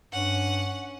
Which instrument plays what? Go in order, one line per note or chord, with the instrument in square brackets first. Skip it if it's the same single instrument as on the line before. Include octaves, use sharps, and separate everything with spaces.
[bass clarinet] G2 [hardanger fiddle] C#4 [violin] F#5